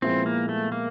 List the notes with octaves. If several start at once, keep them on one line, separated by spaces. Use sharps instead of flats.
A#2 F3 G#3 B3 C4 E4
A#3
A3
A#3